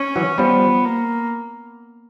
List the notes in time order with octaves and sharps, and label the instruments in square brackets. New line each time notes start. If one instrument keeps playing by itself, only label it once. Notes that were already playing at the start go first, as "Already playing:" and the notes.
Already playing: [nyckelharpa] C#4
[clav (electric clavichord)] E3 F#3
[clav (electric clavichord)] F3 G3 [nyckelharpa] B3
[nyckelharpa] A#3